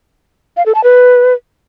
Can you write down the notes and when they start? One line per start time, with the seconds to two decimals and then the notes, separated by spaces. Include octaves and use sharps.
0.57 F5
0.66 A4
0.75 A5
0.84 B4